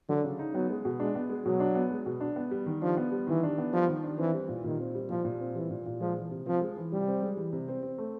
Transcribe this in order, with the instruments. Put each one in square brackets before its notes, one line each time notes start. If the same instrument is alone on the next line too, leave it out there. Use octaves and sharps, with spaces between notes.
[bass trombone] D3 [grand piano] F#3
[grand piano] C#3
D#4
[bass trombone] F#3 [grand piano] B3
[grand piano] G#3
B2
[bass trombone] G#3 [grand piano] D4
[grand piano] B3
G#3
[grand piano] B2 [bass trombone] F#3
[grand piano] D4
B3
G#3
B2
D4
B3
G3
D#3
[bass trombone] F3 [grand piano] D4
[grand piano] B3
G3
[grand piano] D#3 [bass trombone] E3
[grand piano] D4
B3
[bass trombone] F3 [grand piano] G3
[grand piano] D#3
D4
[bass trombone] E3 [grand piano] C4
[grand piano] G3
A#2
[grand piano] A#2 [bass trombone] D#3
[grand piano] C4
G3
[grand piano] A#2 [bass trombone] F3
[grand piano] A#2
C4
[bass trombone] E3 [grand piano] G3
[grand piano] A#2
A#2
[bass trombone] F3 [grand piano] G#3
[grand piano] E3
C3
[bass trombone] F3 [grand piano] C4
[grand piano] G#3
E3
[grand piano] C3 [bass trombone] G3
[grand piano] C4
G#3
E3
C3
C4
C4
A3